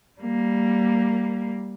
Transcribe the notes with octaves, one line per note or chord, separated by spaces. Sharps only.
G3 A#3